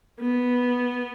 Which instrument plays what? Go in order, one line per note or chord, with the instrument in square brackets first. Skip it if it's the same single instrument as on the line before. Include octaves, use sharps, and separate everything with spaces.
[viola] B3